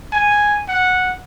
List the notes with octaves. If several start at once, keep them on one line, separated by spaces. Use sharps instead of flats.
G#5
F#5